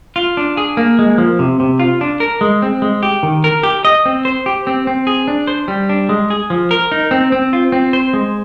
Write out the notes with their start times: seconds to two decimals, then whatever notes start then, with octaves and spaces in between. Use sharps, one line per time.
0.16 F4
0.37 D4
0.57 G#4
0.77 A#3
0.99 G#3
1.18 F3
1.39 C3
1.60 C3
1.79 F4
2.01 D4
2.20 A#4
2.41 G#3
2.62 C4
2.82 G#3
3.03 G4
3.23 D#3
3.44 A#4
3.63 G4
3.85 D#5
4.06 C4
4.25 C5
4.46 G4
4.67 C4
4.87 C4
5.07 G#4
5.28 D4
5.47 C5
5.68 G3
5.89 D4
6.09 G#3
6.30 G#4
6.50 F3
6.71 A#4
6.92 D#4
7.11 C4
7.32 C4
7.53 F4
7.72 C4
7.93 C5
8.13 G#3